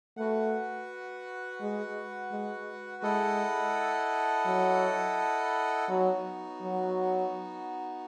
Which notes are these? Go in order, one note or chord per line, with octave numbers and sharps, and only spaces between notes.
A3 F#4 B4 F#5
G#3
G#3
G#3 E4 A4 D#5 F#5
F#3
F#3 B3 D#4 F#4
F#3